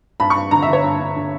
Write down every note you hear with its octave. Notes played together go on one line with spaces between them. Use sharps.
G2 B5
C#6
G2
D3 A#5
E5
D3
C#5
G2
G2
D3